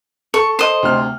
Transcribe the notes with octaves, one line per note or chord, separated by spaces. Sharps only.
A4 C#6
C5 D#5
D2 C3 F6